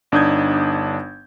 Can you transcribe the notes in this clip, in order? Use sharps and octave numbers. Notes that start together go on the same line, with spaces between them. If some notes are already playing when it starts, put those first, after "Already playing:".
G1 D4 D#4 D#6 G6 G#6